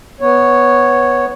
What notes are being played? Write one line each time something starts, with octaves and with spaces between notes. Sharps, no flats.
B3 C#5